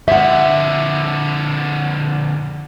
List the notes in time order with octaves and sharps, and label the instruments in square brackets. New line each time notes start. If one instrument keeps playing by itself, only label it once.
[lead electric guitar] F2 D3 [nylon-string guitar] E5 F#5